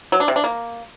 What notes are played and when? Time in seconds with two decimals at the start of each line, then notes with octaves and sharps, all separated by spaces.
0.12 F#3
0.20 D4
0.28 C3
0.36 D4
0.44 A#3